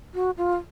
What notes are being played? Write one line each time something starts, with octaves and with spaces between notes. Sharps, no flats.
F#4
F4